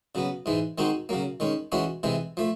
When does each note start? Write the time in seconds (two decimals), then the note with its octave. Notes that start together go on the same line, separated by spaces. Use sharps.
0.15 C#3 F#3 B3
0.46 G#2 E3 G#3
0.78 D#3 G#3 C4 D#4 F#4
1.09 C#3 F#3 A#3
1.40 D#3 G#3 C#4
1.72 E3 G#3 C#4 F#4
2.03 C3 E3 G#3
2.37 F3 A3